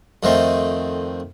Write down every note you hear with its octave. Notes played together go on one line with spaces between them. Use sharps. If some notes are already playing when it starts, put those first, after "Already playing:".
F2 D#3 A3 C4